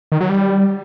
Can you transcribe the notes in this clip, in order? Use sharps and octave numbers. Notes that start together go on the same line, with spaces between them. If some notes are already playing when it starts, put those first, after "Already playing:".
D#3
F#3
G3